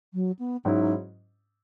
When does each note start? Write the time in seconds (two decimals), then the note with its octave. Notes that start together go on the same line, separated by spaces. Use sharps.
0.14 F#3
0.39 B3
0.65 G#2 F#3 C#4 D#4 E4